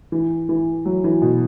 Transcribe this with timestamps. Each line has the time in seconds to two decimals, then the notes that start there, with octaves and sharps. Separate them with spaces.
0.12 E3
0.49 E3
0.85 F#3
1.04 E3
1.22 B2